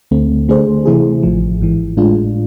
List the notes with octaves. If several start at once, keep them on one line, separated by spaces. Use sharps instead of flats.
D2 D3 A3 C4
D3 A3 D4 G#4 C5
C3 E3 A3 E4 G#4
A1 A2 F3
G#1 G#2 E3
A2 G#3 D4 F4